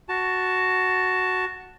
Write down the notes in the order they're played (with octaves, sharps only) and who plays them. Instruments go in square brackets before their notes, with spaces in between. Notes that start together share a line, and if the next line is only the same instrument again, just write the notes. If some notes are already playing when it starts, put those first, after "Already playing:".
[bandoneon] F#4 A5